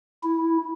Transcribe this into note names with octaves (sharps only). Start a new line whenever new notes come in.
E4